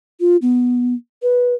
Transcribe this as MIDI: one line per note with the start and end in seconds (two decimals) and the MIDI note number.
0.20 0.37 65
0.42 0.94 59
1.23 1.55 71